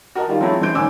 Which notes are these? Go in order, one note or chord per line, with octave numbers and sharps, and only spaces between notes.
F#4 A#4 D#5 A5
D#3 G3 F4
F3 F#3 G#3 A3 C4 E4
A1 E3 C5 C6 G6 D7
G1 A2 D#3 G#5 D6 E6